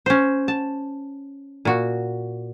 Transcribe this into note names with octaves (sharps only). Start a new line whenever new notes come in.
C#4 C5
A5
A#2 F#4